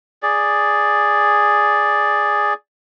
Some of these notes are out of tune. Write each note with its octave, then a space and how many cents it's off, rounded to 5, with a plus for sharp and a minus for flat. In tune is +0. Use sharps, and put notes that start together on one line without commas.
G#4 +0 D5 +0